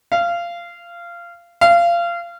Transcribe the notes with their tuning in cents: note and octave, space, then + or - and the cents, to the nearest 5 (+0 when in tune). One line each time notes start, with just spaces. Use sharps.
F5 -20
F5 -25